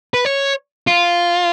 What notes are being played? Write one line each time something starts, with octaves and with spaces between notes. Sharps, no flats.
B4
C#5
F4